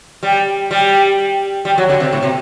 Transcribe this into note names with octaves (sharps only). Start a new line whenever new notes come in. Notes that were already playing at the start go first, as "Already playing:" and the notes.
G3
G3
G3
F#3
D3
C3
A2
C3